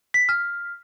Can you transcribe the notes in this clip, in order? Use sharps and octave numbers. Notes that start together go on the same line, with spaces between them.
B6
F6